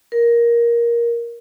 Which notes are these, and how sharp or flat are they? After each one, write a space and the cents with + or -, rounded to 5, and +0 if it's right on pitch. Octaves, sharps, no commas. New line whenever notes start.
A#4 +10